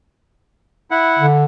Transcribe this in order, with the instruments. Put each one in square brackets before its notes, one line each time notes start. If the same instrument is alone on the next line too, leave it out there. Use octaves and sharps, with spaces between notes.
[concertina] E4 F#5
[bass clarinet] D3